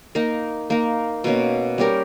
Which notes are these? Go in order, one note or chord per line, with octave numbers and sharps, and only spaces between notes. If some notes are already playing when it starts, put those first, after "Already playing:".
A#3 D#4 A#4
A#3 D#4 A#4
B2 A#3 C#4
G3 C#4 G4 A#4